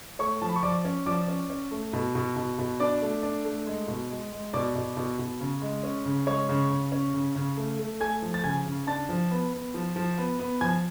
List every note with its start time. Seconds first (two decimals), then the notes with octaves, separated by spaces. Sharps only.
0.19 A3 C#5 C#6
0.42 F3 A5
0.49 B5
0.56 C#6
0.63 F3 D5 D6
0.85 C#4
1.06 F3 D5 D6
1.28 C#4
1.50 C#4
1.71 A3
1.93 B2
2.15 B2
2.36 B2
2.59 B2
2.80 D4 D5 D6
3.02 A3
3.23 D4
3.45 A3
3.67 G#3
3.88 B2
4.10 G#3
4.32 G#3
4.53 B2 D5 D6
4.75 B2
4.97 B2
5.19 B2
5.40 C#3
5.62 G#3
5.83 C#4
6.06 C#3
6.27 G#3 C#5 C#6
6.49 C#3
6.71 C#3
6.92 C#4
7.14 C#3
7.36 C#3
7.57 A3
7.79 A3
8.00 A3 G#5 G#6
8.22 F3
8.34 A6
8.44 C#3 G#5 G#6
8.66 C#3
8.87 D4 A5 A6
9.09 F3
9.31 B3
9.53 B3
9.74 F3
9.96 F3
10.18 B3
10.40 B3
10.61 F3 G#5 G#6